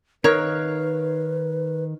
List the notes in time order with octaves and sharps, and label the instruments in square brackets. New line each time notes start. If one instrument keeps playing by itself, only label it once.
[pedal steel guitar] D#3 F5 F#6 [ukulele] D#4 A#4 C#5 [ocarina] B4